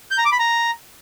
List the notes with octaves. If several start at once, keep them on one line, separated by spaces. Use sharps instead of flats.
G6
A#5
D6
B5
A#5